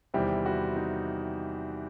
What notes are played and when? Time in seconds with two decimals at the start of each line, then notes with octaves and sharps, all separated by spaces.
0.14 E2 C3 D#3 G3 C4 E4
0.46 F#4
0.76 D#4